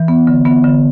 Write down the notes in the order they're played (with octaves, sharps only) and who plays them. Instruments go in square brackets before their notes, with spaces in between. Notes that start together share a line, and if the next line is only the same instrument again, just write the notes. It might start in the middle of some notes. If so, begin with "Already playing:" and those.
Already playing: [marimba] E3
B3
D3
B3
D3